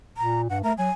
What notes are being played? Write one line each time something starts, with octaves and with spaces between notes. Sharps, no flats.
A#2 A#5
G2 F#5
A3 A#4
F#3 G#5